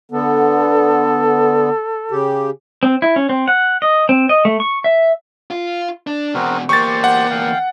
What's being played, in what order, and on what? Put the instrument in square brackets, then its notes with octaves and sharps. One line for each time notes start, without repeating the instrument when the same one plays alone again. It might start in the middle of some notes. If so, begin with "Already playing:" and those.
[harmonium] D3 B3 [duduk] A4
[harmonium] C#3 G4
[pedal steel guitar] C4
E4
C#4
C4
F#5
D#5
C4
D#5
A3
C#6
E5
[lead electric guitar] F4
D4
[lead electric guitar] E2 B2 [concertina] C4 F#4 A#4
[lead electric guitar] E2 A#3 [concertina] G4 C5 [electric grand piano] C#6 A6
[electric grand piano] F#5
[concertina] F5 G5